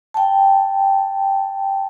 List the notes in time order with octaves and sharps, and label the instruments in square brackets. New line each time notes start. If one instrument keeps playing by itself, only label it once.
[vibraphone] G5 A5